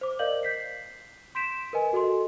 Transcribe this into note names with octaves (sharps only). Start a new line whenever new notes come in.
C5 D6
A#4 D5 D#5 F5 G6 F#7
G6 B6 C7
C6 G6 B6 D7 E7
A#4 B4 D#5 G#5
F#4 A4 D#5 C6